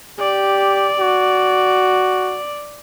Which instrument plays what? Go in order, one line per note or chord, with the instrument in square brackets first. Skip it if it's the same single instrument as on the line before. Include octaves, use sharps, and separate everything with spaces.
[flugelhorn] G4 [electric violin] D5
[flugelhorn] F#4